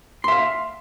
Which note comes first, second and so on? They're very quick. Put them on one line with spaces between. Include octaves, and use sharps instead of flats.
C6 E5 F5